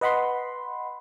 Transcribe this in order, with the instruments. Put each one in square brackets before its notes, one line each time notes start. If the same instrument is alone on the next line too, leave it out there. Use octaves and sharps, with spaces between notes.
[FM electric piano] B4 D#5 F#5 B5 C6